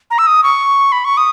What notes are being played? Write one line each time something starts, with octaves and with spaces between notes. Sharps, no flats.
A#5
E6
D#6
C#6
B5
C#6
D#6